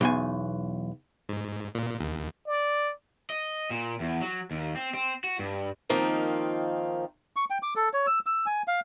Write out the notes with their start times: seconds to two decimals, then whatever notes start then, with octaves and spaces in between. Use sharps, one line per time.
0.01 B1 E2 G#5
1.29 G#2
1.75 A#2
2.00 D#2
2.47 D5
3.30 D#5
3.70 A#2
4.00 E2
4.22 F#3
4.51 D#2
4.76 C4
4.94 C4
5.24 F#4
5.39 G2
5.89 D#3 F3 A#3 C4 D#4
7.36 C#6
7.50 G5
7.63 D6
7.76 A4
7.93 C#5
8.07 E6
8.26 E6
8.46 G#5
8.68 F5